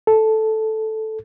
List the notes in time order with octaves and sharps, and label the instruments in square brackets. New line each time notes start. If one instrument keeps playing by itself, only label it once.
[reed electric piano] A4